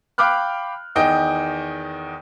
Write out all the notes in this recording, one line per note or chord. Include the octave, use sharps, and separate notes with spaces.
F5 G5 B5 D6 F6 F#6
E2 D#3 D#5 G5